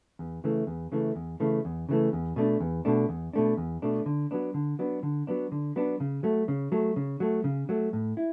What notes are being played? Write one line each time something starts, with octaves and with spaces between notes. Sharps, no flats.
E2
C#3 E3 A3
E2
C#3 E3 A3
E2
C#3 E3 A3
E2
C#3 E3 A3
E2
B2 A3 D4
E2
B2 A3 D4
E2
B2 A3 D4
E2
B2 A3 D4
D3
F#3 B3 D4
D3
F#3 B3 D4
D3
F#3 B3 D4
D3
F#3 B3 D4
C#3
F#3 A3
C#3
F#3 A3
C#3
F#3 A3
C#3
F#3 A3
A2
E4